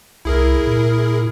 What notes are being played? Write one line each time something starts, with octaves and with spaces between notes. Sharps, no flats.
C2 E4 G#4 A#4
A#2